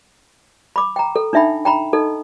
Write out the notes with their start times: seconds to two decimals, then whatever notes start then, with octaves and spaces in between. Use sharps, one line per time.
0.76 B5 D6
0.96 G5 A#5
1.16 A4
1.33 D4 D#4 E5 G5 B5
1.65 G5 A#5 B5
1.93 D#4 A4 D#5